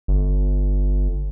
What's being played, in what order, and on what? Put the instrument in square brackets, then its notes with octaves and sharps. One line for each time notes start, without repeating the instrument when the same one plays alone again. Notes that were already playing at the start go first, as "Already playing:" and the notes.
[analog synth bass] G1